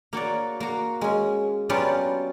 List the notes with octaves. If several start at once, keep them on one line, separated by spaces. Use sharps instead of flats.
A#3 F#4 C#5 D5
A#3 F#4
G#3 C#4
F#3 B3 C#4 F4 G4 D5